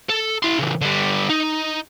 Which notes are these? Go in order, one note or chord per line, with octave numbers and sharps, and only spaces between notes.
A4
E4 C6
C#3 E3
D3 G3
D#4